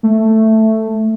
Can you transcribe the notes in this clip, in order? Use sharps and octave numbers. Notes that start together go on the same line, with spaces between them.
A3